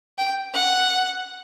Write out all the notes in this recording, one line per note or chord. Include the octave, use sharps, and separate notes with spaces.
G5
F#5